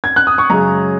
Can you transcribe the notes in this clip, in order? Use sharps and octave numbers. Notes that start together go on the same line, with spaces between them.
G#6
F#6
D#6
C#6
F#2 C#3 G#3 A#5